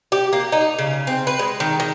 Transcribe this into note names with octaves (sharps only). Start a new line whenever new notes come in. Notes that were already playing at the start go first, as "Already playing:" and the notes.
G4
A#3
D#4
C#3
C4
B4
G#3
D#3
D#3